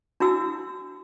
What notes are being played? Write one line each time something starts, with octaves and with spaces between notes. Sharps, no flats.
D4 E4 F#4 E6